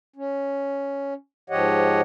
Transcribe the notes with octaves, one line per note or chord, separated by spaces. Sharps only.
C#4
G#2 F3 G4 C#5 D#5 F#5